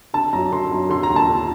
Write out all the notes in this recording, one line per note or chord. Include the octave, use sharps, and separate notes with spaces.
D3 A5
F#2 A#5
D3 C6
F#2
D3 C6
A#5
D#2
A5
D3